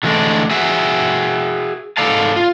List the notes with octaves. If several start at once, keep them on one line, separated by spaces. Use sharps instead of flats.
D3 E3 G#3 A3 D4
F#4 G#4 E5
G#2 A4 D5 F5 A5
F4